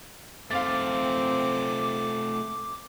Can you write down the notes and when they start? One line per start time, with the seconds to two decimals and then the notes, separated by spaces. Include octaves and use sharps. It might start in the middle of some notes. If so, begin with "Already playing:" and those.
0.51 A3 C4 F4 F5 D6 A6